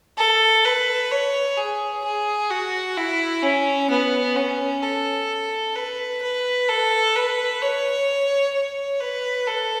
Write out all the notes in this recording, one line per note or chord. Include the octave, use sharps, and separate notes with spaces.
A4
B4
C#5
G#4
G#4
F#4
E4
C#4
B3
C#4
A4
B4
B4
A4
B4
C#5
C#5
B4
A4